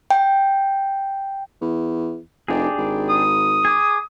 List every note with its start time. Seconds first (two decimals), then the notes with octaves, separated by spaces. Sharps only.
0.11 G5
1.61 E2
2.48 F1 D4 G4 G#4
2.78 G#1
3.09 D#6
3.65 G#4 D6